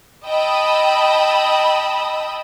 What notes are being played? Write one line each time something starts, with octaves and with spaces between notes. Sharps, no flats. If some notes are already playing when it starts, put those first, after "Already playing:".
D#5 G5 A5 B5 D#6 E6